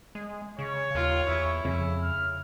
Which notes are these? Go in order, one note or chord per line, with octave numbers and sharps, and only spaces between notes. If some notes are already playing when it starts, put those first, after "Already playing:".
G#3
C#3 C#5
D#2 F4
E2 E4
F2 C#3
F6